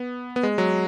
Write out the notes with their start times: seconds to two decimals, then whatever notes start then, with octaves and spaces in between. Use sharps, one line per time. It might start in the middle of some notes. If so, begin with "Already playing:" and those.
Already playing: B3
0.36 B3
0.43 G#3
0.58 F#3